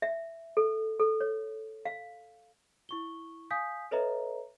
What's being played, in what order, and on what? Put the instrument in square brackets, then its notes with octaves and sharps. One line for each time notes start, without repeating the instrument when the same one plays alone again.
[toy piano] E5
A4
A4
C#5
F5
[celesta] E4 C#6 G7
F5 G#5 D#6 G6 B6
A4 B4 C#5 D#5 E5 A#5